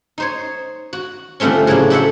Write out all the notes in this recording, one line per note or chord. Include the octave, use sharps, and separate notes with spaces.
D#4 C5 C#5
F#4
D3 F3 G3 A3 C4 C#4
A2 C#3 F#3 A#3 D4
F#4 G4 A4 C5 E5 F#5